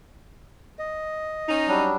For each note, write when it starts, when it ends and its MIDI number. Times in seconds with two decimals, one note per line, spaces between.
0.79 1.67 75
1.48 1.87 61
1.48 1.87 63
1.68 1.97 54
1.68 1.97 55
1.68 1.97 62